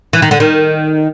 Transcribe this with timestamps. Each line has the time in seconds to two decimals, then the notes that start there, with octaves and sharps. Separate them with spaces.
0.13 E3
0.22 D#3
0.31 D3
0.40 D#3